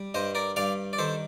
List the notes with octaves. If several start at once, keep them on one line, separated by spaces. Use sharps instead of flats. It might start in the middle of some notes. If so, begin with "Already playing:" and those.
Already playing: G3
G2 C5 D#5
A#4 D5
G2 D5 F5
D5
D#3 A4 C5